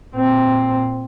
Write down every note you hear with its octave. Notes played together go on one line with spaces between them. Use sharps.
A#2 C4